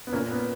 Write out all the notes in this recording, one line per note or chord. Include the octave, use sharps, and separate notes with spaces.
B3
A#2 A#3 C#4
B3